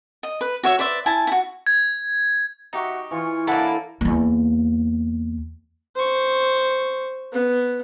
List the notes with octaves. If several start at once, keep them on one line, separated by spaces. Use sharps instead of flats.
D#5
B4
F#4 C#5 E5
B4 C5 D5 E5
E4 G#5 A5
E4 F#4
G#6
D#4 F#4 G4 D#5 E5 C#6
E3 F4 C#6
A#3 D4 E4 A4 C#5 F#5 A5 B5
E2 A#3
C5 C#6
B3